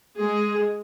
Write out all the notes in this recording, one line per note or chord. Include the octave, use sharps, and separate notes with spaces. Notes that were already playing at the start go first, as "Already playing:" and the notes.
G#3 G#4